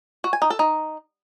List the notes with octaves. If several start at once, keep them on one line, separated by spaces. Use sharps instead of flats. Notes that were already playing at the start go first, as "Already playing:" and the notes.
F#4
G#5
D#4
A4
D#4